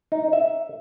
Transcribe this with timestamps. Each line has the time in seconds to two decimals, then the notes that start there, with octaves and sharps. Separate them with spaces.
0.12 D#4
0.33 E5